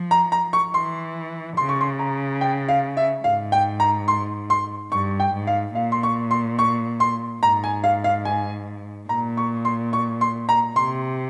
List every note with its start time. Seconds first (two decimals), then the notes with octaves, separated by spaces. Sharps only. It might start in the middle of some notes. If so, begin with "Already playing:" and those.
Already playing: F3
0.11 A#5
0.32 A#5
0.53 C#6
0.74 E3 C6
1.57 C#3 C6
1.69 C#6
1.81 C6
1.99 A#5
2.41 G5
2.69 F5
2.97 E5
3.24 G#2 F5
3.52 G5
3.80 A#5
4.08 C6
4.50 C6
4.92 G2 C#6
5.20 G5
5.33 G#2
5.47 F5
5.75 A#2 F5
5.92 C6
6.03 C#6
6.31 C6
6.59 C#6
7.00 C6
7.42 G#2 A#5
7.64 G#5
7.84 F5
8.04 F5
8.25 G#5
9.09 A#2 A#5
9.37 C#6
9.65 C6
9.93 C#6
10.21 C6
10.49 A#5
10.76 C3 C6